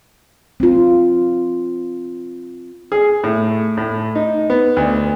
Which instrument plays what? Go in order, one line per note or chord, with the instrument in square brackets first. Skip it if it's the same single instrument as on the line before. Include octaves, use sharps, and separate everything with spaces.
[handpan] C4 F4
[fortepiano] G#4
A2
A2
D#4
B3
D2